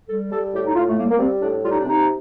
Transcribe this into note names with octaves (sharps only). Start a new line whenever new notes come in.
G3 A4
G3 A4
A2 G4
D#4
A2 F4
A3
G3 A#3
A#3
G3 C4
A2 D4
G3 F4
D#4
D4
C3 D#4